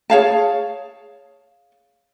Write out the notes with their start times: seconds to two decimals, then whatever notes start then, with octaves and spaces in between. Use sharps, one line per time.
0.10 G#4 C#5 F5 A5